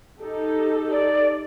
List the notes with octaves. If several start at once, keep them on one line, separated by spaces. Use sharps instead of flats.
D#4 G4 A4
D5